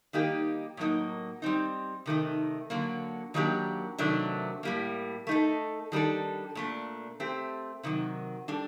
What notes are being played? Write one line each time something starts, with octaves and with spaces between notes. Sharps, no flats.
D#3 G3 A#3 D#4 G4
A2 F#3 A#3 D#4
G3 C4 D#4
C3 D#3 A3 D#4
D3 F#3 A#3
D#3 F#3 A#3 D4 G4
C3 D#3 F#3 A3 D4
A2 G3 A#3
A3 D#4 A4
D#3 G3 D4 A4
A#2 A3 D4
A3 C4 G4
C3 D#3 F#3
G3 D4 A4